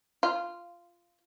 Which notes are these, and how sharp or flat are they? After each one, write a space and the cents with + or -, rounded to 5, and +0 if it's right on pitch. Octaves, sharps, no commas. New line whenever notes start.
F4 -10